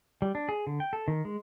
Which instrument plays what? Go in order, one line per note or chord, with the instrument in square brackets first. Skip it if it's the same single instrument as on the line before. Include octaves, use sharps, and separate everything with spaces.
[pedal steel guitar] G3
D4
G#4
D3
G5
A4
D#3
G#3